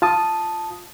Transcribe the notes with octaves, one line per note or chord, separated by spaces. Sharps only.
F4 A5 D#6